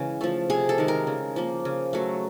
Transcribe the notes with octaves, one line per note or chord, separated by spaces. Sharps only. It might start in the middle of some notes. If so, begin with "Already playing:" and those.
Already playing: C#3 E3 G#3
F3 A3
C3 G#4
A4
D#3 G#3
A#4
C#3
F3 A#3
C#3
F#3 A3